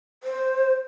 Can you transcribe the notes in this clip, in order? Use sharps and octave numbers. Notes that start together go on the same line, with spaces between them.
C5